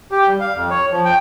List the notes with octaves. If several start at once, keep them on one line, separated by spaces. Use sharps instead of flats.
G4
G3
F5
F2
C#5
F3
G5